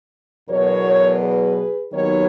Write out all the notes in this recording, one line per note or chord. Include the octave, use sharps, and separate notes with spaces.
E2 B2 F#3 A#4 C#5
G#4 B4
D#2 D#3 F#3 B3 D#4 A#4 C#5